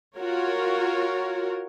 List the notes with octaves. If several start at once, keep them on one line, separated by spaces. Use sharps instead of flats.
F4 F#4 A#4 C#5